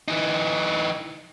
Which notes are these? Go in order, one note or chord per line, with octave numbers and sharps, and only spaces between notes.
E3 D#4